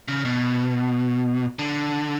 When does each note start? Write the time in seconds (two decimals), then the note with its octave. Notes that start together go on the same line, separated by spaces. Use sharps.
0.08 C#3
0.25 B2
1.59 D3